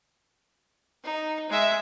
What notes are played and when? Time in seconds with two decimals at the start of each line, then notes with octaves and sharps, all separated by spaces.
1.04 D#4
1.49 G#3 E5